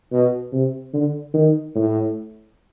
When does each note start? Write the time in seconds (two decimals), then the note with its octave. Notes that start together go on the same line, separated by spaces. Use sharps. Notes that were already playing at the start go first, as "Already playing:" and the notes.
0.12 B2
0.52 C3
0.94 D3
1.34 D#3
1.75 A2